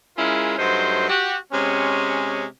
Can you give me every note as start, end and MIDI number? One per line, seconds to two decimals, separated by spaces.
0.18 0.57 56
0.18 0.57 61
0.18 0.57 64
0.18 0.57 65
0.18 0.57 68
0.18 0.57 70
0.58 1.08 43
0.58 1.08 54
0.58 1.08 57
0.58 1.08 63
0.58 1.08 72
1.10 1.36 66
1.10 1.36 67
1.52 2.44 48
1.52 2.44 56
1.52 2.44 60
1.52 2.44 61